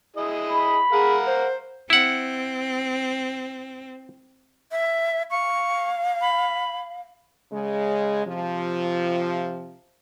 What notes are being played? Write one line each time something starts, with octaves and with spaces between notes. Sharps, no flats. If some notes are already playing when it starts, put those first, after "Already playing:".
E4 G#4 D#5
B5
G#4 A#4 F5 F#5
C5
C4 E4 F#5
E5
F5 C#6
B5
C#3 G#3
C3 F3